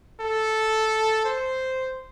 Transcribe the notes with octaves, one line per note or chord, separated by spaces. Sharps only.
A4
C5